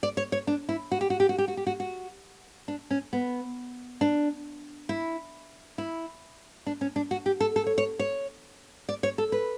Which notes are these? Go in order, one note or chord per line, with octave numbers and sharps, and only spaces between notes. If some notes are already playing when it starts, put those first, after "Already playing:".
D5
C#5
C#5
D4
E4
F#4
G4
F#4
G4
F#4
G4
F#4
G4
F#4
F#4
D4
C#4
B3
D4
E4
E4
D4
C#4
D4
F#4
G4
A4
A4
C#5
C#5
C#5
D5
C#5
A4
B4